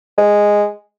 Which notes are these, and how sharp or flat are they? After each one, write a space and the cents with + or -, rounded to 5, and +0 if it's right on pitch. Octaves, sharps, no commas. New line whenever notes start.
G#3 -5